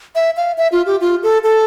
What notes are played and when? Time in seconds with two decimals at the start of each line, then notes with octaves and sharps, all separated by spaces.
0.15 E5
0.37 F5
0.58 E5
0.72 F4
0.86 G4
1.01 F4
1.23 A4
1.44 A4